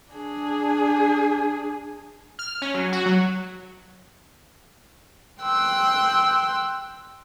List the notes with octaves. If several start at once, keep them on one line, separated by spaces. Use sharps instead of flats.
D4 G#4
F6
C#4
F#3
F#4
F#3
G5 C6 E6 F#6